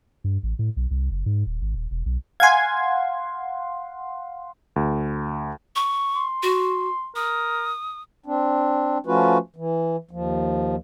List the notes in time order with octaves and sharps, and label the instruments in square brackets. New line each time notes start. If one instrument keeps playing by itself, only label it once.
[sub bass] G2
A1
A2
B1
C2
F#1
G#2
D#1
G#1
D#1
E1
B1
[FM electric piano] F5 F#5 C6 [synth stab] G#5 G#6
[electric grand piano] D2
[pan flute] C#6
[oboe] C6
[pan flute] F#4
[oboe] A#4 [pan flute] D#6
[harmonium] C4 D4
F3 A3 C#4 F4 F#4 B4
E3
D#2 F3